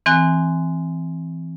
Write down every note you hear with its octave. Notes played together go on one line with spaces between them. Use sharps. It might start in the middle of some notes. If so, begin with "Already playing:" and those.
E3 C4 G#5 F#6